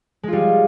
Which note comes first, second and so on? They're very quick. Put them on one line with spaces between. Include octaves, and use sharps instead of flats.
G#3 F4 G3